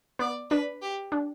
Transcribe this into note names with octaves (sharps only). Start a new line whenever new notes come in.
B3 D5
D4 B4
G4
D4